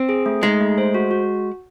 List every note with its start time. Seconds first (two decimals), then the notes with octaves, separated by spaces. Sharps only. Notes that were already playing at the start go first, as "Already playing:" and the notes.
Already playing: C4
0.09 G#4
0.26 A3
0.43 G#3 D#4
0.61 A3
0.78 C5
0.94 F#4
1.11 F#4